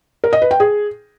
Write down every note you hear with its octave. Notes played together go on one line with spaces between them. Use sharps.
A#4
D#5
B4
G5
G#4